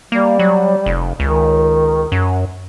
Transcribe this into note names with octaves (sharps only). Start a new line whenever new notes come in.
G3 A#3
F#3
F1
C#2 D#3
F#2